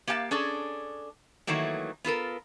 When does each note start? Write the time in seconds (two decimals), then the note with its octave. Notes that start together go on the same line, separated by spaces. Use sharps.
0.07 A#3 G4 F5 G5 A5
0.31 C#4 D4 G#4 A4
1.47 D#3 E3 F#3 A3 A#3
2.04 B3 F4 A4 A#4